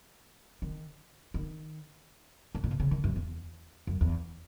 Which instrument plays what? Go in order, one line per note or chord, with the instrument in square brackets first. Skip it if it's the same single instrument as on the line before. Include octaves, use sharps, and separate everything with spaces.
[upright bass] D#3
D#3
G#2
A#2
B2
C#3
D#3
F#2
E2
F#2
E2